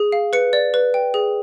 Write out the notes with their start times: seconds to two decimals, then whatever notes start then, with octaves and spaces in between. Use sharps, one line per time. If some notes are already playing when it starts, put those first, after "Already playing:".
Already playing: G#4
0.12 F5
0.33 B4 C#7
0.53 D5
0.74 B4
0.94 G5
1.14 G#4